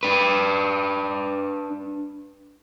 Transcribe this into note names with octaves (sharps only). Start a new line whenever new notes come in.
D4 B4